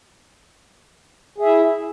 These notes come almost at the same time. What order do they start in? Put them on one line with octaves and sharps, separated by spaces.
G#4 E5 E4